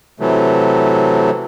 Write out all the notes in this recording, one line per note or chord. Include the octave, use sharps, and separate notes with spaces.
C3 E3 F#3 A3